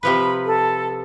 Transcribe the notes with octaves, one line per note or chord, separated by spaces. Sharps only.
C3 F3 B4 B5
A4